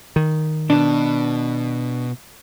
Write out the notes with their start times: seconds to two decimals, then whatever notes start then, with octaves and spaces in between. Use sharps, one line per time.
0.16 D#3
0.70 B2 D4